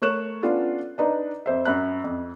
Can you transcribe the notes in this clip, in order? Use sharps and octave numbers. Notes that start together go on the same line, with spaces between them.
A3 A#4 C#5 C#6 F#6 E7
B3 C#4 D4 F4 A4
D4 D#4 B4
F2 C5 E5
F#2 B5 F#6
F2